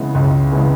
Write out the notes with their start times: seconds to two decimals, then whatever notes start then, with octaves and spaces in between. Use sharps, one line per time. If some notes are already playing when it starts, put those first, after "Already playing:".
Already playing: C#3 E3 G#3 B3
0.15 C#2
0.52 C#3 E3 G#3 B3